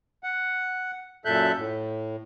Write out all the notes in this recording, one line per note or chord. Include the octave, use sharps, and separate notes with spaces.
F#5
F#2 A#2 A4 E5 F#6 G6
A2